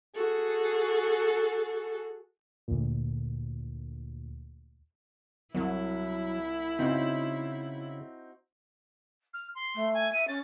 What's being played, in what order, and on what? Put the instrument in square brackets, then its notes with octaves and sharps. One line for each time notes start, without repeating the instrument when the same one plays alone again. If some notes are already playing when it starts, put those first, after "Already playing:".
[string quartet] F#4 G#4 A4
[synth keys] D2 A#2
[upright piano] C2 [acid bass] F#3 [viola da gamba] E4
[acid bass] C#3 [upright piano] C4 D#4 F#4
[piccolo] F6
C6
[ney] A3
[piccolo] G#5
[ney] E5 [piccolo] D#7
[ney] C#4 [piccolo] A6